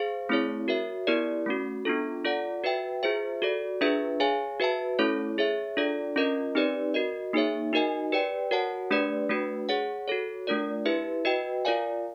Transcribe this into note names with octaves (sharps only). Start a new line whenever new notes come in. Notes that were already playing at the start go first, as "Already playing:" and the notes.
Already playing: G#4 C5 F5
A3 C4 E4 G#4 C#5
F#4 A#4 C#5 E5
B3 E4 G4 A#4 D5
A3 C#4 F#4
B3 D4 F4 A4
F4 A4 D5 F#5
F#4 B4 E5 G5
F4 G#4 C5 E5
F#4 A4 D5
D4 F4 G#4 B4 E5
G#4 C#5 F5 G#5
F#4 B4 E5 A5
A3 C#4 E4 A4 C#5
G#4 C#5 E5
D4 F4 A4 D5
C#4 F4 A#4 D#5
C4 D#4 G4 B4 D5
F#4 A#4 D#5
A#3 D#4 G#4 C#5 E5
D#4 F#4 A#4 D#5 G#5
G4 B4 D5 G5
F#4 A#4 C#5 F#5 A5
A3 D4 G4 B4 D5
A3 D4 F#4 B4
G#4 C#5 F#5
F#4 A4 C#5
A3 D4 F4 A#4 D5
E4 G4 B4 E5
F#4 B4 D#5 G5
F4 A#4 D5 F5 G#5